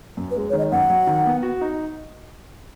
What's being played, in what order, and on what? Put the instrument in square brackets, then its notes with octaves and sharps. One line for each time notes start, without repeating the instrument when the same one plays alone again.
[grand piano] F#2
[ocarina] B4
[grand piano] G#3
[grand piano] D#3 [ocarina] C#5
[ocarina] D#5
[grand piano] F#2 [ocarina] F#5
[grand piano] F#3
D#3
B3
F#4
D#4